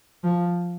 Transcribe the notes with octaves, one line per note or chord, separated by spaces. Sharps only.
F3